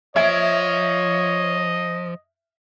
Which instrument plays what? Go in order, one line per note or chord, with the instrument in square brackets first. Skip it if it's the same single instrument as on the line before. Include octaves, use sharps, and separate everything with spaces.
[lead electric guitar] F3 [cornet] C#5 [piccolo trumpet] D#5 [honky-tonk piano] E5 G#6 D7